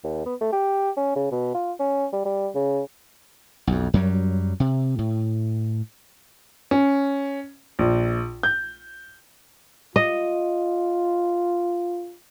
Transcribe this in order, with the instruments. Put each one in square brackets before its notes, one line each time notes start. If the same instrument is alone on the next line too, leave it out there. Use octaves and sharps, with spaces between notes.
[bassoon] D#2
B3
A3
G4
C#4
C#3
B2
F4
C#4
G3
G3
C#3
[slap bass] B1 F2
F#2 F#3 G3
C3
A2
[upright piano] C#4
A#1
G6
[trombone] F4 [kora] D#5